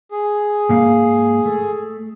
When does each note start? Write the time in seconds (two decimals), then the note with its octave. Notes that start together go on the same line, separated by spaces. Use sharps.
0.11 G#4
0.69 G#2 A#3 F5
1.46 A3